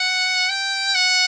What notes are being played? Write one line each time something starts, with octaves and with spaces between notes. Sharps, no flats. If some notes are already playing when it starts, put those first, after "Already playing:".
Already playing: F#5
G5
F#5